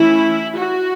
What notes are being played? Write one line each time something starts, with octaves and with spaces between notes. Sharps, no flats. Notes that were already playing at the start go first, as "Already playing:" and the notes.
Already playing: E3 A3 C#4 E4
F#4